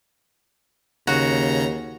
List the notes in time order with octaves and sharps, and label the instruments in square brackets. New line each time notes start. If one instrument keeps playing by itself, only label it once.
[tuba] D#2 [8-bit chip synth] C#3 A#5 [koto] F#4